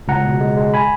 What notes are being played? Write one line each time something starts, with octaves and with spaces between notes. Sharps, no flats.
C#2 F#5 A#5
B2
G#3
G#3
G#5 B5